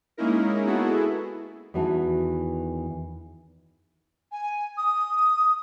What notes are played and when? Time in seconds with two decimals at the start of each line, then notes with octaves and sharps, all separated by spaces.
0.17 G#3 A#3 C#4 D#4 E4 A#4
0.66 B3 E4 F#4 G#4 A4
1.74 E2 D#3 E3 F#4 A5
4.32 G#5
4.77 D#6